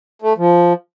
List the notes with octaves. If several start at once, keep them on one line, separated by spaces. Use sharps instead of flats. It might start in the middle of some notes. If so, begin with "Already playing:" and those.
A3
F3